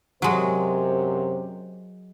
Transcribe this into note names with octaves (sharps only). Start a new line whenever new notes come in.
F#2 C3 F#3 G#3 C5